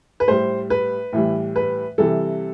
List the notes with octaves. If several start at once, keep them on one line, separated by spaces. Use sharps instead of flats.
B4
A2 G3 C5
B4
A2 E3 G3
B4
C3 E3 G3 A4